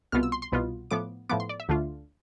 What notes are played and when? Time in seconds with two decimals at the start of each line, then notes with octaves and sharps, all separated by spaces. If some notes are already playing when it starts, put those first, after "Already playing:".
0.12 C2 B2 B3 F4 F6
0.23 E6
0.32 C6
0.42 C6
0.52 C2 B2 B3 F4
0.91 A2 F3 B3 D6
1.29 A2 F3 B3 D6
1.40 C6
1.49 D5
1.60 E5
1.69 D2 D3 A3 D4 F4